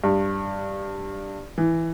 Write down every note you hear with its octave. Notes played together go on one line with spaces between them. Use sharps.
G2
E3